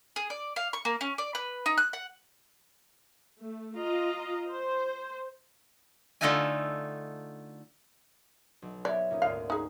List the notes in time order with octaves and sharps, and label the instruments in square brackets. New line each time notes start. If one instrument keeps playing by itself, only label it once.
[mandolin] G#4
D5
F5
C#6
A#3
C#4
D5
B4
D#4
F#6
F#5
[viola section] A3
F4 D#5 A#5
C5
[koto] D3 A3 D#4 F4 E5 G#5
[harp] B1
[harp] B3 C#5 E5 [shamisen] D5
[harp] A#2 C#4 D#4
[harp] D2 G#2 [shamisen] F5
[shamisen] D#4 G#4